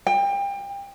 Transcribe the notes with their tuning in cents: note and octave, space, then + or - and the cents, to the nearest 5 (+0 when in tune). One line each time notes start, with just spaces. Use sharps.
G5 +30